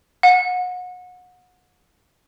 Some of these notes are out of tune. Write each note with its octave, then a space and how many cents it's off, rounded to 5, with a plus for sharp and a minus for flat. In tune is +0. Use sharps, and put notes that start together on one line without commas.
F#5 -30